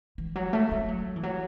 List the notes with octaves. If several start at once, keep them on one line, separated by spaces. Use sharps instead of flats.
E3
F#3
A3
A3
F#3
E3
F#3